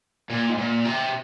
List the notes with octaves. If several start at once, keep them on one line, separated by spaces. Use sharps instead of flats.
A#2
G#2
A#2
C3